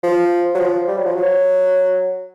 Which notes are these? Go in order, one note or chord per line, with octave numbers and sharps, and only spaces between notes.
F3
F#3
F3
G3
F#3
F3
F#3